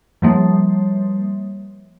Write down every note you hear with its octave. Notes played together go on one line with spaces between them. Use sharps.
F3 G3 A#3